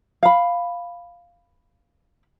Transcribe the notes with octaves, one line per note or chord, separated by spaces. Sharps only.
F5 B5